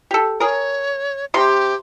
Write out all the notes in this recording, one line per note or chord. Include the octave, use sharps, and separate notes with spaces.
G4 A4
G#4 A#4 C#5
C3 G4 C6